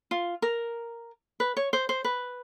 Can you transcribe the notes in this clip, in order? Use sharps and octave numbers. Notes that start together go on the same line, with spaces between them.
F4
A#4
B4
C#5
C5
C5
B4